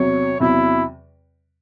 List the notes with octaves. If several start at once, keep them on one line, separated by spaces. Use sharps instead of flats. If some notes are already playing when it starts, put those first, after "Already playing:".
Already playing: E2 C3 F#3 C#5
E2 C3 F#3 E4